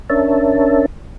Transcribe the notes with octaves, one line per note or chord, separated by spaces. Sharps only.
C#4 D4 A#4 C#5 E5 A5